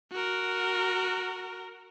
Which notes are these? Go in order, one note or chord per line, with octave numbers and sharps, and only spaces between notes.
F#4 A#4